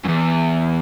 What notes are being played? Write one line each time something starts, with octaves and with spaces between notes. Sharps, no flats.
F#2
E2